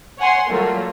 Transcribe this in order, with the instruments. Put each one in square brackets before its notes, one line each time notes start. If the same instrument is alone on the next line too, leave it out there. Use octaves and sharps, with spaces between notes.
[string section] C#5 F#5 G#5 C6
F#3 G3 A3 A#3 F4